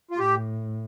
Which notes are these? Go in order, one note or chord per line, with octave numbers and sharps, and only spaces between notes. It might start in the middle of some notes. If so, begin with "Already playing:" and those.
F4
A2 G4